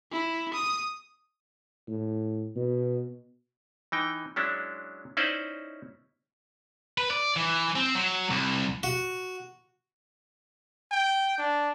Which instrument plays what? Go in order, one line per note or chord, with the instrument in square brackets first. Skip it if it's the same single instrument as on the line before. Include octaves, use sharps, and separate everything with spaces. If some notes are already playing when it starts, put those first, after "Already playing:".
[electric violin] E4
D#6
[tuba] A2
B2
[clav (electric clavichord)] E3 D#4 G5
F#3 G#3 C#4 D4 E4
C#4 D#4 E4 C5 D5 D#5
[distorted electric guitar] B4
D5
E3
C4
F#3
C2
[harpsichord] F#4
[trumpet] G5
D4